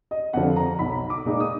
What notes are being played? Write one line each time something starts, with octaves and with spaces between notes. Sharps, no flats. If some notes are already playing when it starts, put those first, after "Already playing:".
D#5
F2 D3 F3 F#5
A#5
B1 B5
D6
A#2 G#3 D#4
D#6